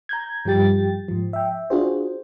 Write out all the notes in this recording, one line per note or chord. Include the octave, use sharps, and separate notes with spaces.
A#5 G6 G#6
G2 F3 G3 G4 G5 A6
G#2 F3
E5 G5
D4 F4 F#4 G#4 C5